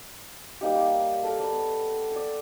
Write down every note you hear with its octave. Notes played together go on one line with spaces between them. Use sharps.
G3 A#3 D#4 G4
A#5 D6
A4 A#4
D5 B5
B3
D5 E6